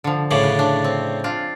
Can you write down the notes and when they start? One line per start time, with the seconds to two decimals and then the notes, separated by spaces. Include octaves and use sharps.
0.04 D3 F3
0.31 A2 C#3 D5
0.44 B4
0.59 D4
0.84 C4
1.24 D4 F4